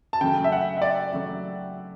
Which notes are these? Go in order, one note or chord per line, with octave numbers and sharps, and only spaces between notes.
A5
C#3 F#3 A3 G5
E5
F#5
E5
D5
C#3 F#3 A3